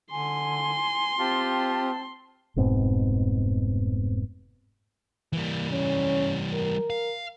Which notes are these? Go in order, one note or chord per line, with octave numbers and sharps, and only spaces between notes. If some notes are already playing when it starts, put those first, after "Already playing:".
D3 G#5 C6
C4 F4 G4 A5
F1 G#2 B2 C4
E3 G3 A#3
C#4
A#4
F5